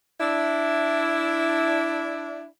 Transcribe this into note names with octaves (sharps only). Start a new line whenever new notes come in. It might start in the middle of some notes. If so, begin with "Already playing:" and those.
D4 E4